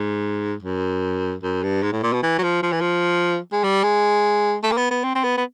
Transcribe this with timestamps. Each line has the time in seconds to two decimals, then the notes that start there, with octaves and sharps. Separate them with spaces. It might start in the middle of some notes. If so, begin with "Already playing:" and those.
Already playing: G#2
0.62 F#2
1.43 F#2
1.63 G2
1.83 G#2
1.93 A2
2.03 A#2
2.13 B2
2.23 E3
2.38 F#3
2.43 F3
2.63 F3
2.72 E3
2.81 F3
3.52 G#3
3.64 G3
3.84 G#3
4.63 A3
4.72 A#3
4.77 B3
4.91 B3
5.04 C4
5.15 C4
5.24 B3
5.37 B3